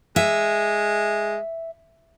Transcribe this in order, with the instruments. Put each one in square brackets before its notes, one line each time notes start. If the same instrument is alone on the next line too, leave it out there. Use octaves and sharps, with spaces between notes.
[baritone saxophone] G#3 [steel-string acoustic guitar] E5